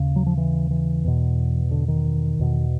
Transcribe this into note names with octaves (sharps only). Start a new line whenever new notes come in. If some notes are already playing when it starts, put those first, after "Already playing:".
Already playing: D#2 C#3
F#3
F3
E3
E3
E2 B2
D3
D#3
E2 B2